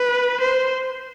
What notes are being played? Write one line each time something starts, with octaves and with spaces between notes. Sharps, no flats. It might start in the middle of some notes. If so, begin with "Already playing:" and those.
Already playing: B4
C5